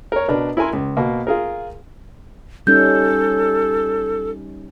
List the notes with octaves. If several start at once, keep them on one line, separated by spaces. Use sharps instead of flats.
A#4 C#5
B2 D4 A#4 B4
E4 A#4 G#5 C6
C#2
B2 A#3
F4 G#4 A#4
G3 C#4 D#4 A4 G6